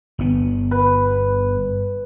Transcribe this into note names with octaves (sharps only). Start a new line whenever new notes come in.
G1 B3
B4